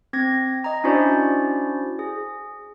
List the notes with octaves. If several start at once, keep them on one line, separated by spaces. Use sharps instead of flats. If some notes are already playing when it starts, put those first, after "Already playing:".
C4 G#6 A#6
D#5 A#5
C#4 D4 E4 F#4 C5 D5
G#4